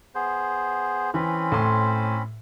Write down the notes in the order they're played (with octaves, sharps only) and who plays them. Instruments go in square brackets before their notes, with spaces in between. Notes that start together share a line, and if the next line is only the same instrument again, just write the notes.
[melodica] B3 G#4 C5
[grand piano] E3 [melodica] C4 C#4 B5
[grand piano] A2 C6